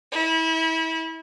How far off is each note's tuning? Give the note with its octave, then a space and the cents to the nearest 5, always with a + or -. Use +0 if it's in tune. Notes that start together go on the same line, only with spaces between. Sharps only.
E4 -30